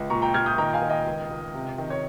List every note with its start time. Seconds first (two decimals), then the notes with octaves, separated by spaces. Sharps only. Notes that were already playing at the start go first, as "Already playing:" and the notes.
Already playing: C#2
0.10 A#2 A#5 C#6
0.22 G5 A#5
0.34 A#2 F6 G#6
0.46 D#6 G6
0.58 D#3 G5 A#5
0.74 F5 G#5
0.81 D#3
0.90 D#5 G5
1.06 C#2
1.30 C#2
1.54 C3
1.78 D#3
1.90 C#5